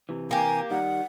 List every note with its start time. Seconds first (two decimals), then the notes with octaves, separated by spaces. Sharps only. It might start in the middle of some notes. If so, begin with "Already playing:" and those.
0.09 C3 E3
0.31 A#3 G4 G#5
0.71 D#3 G3 F#5